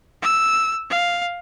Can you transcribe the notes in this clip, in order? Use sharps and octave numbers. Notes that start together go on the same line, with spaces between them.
E6
F5